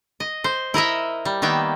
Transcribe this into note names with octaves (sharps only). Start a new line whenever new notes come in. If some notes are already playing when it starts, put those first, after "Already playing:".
D#5
C5
E4 A#4 D#5 E5
G3
D#3 A#3 B3 E5 G5